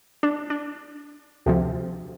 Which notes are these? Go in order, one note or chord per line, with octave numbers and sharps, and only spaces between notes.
D4
D4
D2 C3 F3